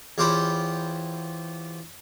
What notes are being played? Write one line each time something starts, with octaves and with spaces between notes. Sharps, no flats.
E2 F4 G4 C5 C#5 B5